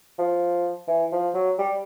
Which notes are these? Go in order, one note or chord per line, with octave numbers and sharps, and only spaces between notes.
F3
E3
F3
F#3
G3